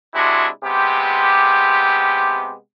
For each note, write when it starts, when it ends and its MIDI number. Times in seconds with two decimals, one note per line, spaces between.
0.14 0.48 48
0.14 0.48 56
0.14 0.48 62
0.14 0.48 64
0.14 0.48 66
0.63 2.54 48
0.63 2.54 56
0.63 2.54 59
0.63 2.54 67